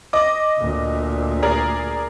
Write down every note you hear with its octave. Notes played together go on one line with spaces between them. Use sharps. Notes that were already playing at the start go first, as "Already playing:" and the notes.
D#5 D6
D2 A#2
G#4 A#4 D5